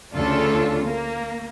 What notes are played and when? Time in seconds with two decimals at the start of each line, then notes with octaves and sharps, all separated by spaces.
0.14 D2 C#3 D4 F4 A4
0.84 A#3